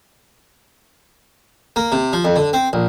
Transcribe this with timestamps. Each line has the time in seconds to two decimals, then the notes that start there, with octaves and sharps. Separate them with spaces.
1.76 A#3
1.92 C3
2.13 F3
2.25 F2
2.36 D3
2.53 C4
2.73 A#1